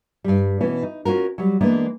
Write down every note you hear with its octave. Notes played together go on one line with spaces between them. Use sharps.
G2 G3
B2 E3 B3 C#4
D#4
C#4 F4 F#4 A#4
F#3 G3
E3 G#3 A#3 B3 D4